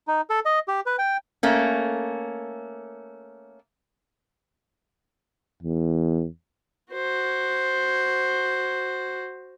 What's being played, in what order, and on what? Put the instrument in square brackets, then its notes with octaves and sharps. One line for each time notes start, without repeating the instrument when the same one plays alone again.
[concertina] D#4
A4
D#5
G4
B4
G5
[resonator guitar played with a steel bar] A3 A#3 C#4
[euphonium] E2
[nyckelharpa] F#4 C5